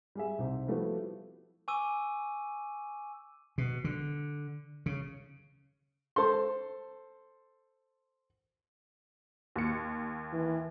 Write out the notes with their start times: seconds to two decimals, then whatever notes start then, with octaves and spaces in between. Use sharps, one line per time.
0.15 G3 G#4 E5
0.39 C2 C4 D#4 G4
0.67 F3 G3 A3 B3 E4 F#4
1.68 G#5 C#6 D6 E6 D#7
3.58 B2
3.84 D3
4.86 C#3
6.16 A4 C5 C6
9.56 D#2 C#7
10.33 E3